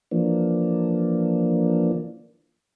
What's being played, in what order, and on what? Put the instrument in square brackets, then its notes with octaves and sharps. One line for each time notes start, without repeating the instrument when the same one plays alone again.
[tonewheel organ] E3 F3 A#3 D4